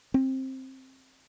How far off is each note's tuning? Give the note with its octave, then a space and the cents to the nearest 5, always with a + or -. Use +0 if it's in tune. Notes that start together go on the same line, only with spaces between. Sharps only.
C4 +15